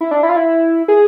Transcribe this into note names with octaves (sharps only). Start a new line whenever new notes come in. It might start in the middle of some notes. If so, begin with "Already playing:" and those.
E4
D4
E4
F4
E4
G#4